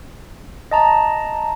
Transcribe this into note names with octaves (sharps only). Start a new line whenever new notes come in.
D#5 A5 A#5